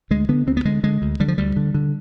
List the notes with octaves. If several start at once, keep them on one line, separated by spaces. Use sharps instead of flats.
D2 G#3
D3 B3
D2 C4
B3
D3 G#3
D3 G#3
D2
D3 G3
F3
D2 G3
D3
D3